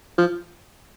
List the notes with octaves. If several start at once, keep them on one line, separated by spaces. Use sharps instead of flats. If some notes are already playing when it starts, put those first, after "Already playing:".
F3